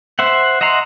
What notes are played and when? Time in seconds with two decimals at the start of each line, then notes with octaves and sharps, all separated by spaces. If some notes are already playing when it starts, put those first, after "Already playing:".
0.19 C5 E5 F#5
0.61 D#5 E5 F#5 A#5 C6